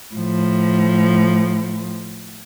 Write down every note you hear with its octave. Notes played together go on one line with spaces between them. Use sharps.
A2 F3